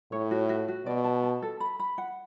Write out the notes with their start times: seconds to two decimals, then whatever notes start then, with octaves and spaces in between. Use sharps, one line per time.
0.12 A2 C#5
0.31 F#4
0.49 F#4
0.68 F#4
0.86 B2 D5
1.04 A5
1.23 A5
1.42 A4
1.60 B5
1.79 B5
1.98 F#5